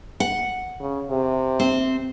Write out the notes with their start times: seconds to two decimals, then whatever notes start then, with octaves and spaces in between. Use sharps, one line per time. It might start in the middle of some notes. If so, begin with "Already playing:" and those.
0.20 F#5
0.80 C#3
1.10 C3
1.60 C4